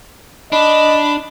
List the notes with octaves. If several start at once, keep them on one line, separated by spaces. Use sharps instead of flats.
D4 D#5 B5